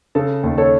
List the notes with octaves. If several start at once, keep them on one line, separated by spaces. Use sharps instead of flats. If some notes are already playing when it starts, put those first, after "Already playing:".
C#3 A4
D#2
A4 C#5